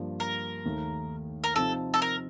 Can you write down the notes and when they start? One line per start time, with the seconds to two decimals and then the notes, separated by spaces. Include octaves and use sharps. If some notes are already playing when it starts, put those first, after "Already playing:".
Already playing: G2 F3 A#3 D4
0.20 A#4
0.65 D#2 D#3 A3
1.44 A#4
1.56 C3 F3 C4 D#4 A4
1.94 A4
2.02 A#4